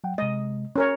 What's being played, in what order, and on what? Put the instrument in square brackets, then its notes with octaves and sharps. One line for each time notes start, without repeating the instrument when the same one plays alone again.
[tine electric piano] F#3 F#5 G5
[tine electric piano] C3 G#3 [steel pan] D#5
[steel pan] C#4 A#4 C#5